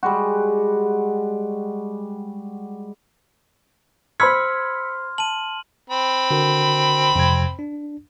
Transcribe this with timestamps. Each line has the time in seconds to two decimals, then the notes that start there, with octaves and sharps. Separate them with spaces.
0.03 G3 G#3 F#4
4.20 C5 B5 C6 E6 F6 G#6 B6 C#7
5.18 A5 D#7 F#7
5.90 C4 B5
6.31 D3 F#4 A#4
7.16 F2 C3 G#6
7.59 D4